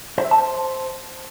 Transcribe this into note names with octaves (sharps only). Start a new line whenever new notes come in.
C5
E5
A5
C5